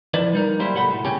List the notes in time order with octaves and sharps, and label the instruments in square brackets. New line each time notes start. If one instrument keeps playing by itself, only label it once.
[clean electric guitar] F3 E4 B4 C5 D5
G3 D#4 A#4
F#3 G3 A#3 E4 G4 C5
C2 A2 F#3 A4 F#5 B5
A2
A#2 C#3 C#4 G4